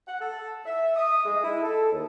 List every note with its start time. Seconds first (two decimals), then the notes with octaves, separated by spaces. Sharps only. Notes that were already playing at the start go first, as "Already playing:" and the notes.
0.07 F#5
0.20 A4
0.64 E5
0.96 D#6
1.25 G#3
1.43 E4
1.62 A4
1.92 D#2